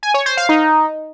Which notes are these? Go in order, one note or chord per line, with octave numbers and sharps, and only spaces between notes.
G#5
C#5
C5
F5
D#4